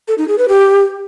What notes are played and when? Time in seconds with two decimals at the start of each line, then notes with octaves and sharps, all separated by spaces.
0.08 A4
0.18 D#4
0.28 G#4
0.38 B4
0.48 G4